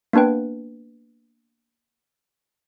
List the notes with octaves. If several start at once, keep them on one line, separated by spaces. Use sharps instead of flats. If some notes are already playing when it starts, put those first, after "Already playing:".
A#3 B3 D4 B4 G5